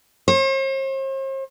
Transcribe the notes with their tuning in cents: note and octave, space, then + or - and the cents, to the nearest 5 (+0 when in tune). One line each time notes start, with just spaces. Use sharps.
C5 +45